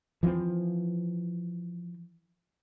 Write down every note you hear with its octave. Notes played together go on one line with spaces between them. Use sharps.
E3 F3 A3 C4